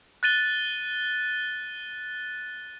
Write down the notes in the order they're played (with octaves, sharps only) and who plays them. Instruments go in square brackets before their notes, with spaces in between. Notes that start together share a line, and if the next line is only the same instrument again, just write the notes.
[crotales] F#6 A6 D#7 G7